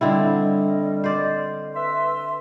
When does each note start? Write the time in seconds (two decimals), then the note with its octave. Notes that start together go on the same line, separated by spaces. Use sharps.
0.01 D3 G3 C4 E4 D#5
1.04 C5 D5
1.75 B4 E5 C6